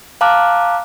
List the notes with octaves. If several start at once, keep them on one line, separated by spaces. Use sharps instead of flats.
F5 A5 A#5 D6 F6 F#6